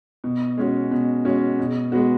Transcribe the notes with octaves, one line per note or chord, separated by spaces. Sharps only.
B2
G#3 C#4 F#4
B2
G#3 C#4 F#4
B2
G#3 B3 F#4